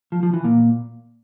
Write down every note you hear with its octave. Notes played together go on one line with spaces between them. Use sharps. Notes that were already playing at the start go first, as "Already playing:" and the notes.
F3
F3
E3
A#2